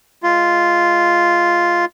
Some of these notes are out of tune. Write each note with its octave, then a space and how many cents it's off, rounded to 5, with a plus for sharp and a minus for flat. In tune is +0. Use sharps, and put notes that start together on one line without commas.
G#3 +0 F4 -5